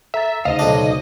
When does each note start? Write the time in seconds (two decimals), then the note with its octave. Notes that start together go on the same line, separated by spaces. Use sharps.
0.14 A4 E5 A#5 A6
0.45 D2 C#3 D#4 C5 D#5 F5
0.59 B1 D4